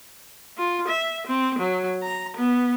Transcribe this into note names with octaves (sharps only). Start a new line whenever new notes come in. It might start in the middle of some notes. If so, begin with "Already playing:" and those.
F4
E5
C4
F#3
A#5
B3